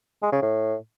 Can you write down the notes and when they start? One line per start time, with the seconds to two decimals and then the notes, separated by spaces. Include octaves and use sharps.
0.22 G#3
0.32 C#3
0.42 A2